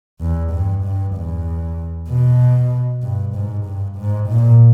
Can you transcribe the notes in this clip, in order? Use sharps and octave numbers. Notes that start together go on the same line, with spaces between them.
E2
G2
G2
E2
B2
G2
G#2
G2
G#2
A#2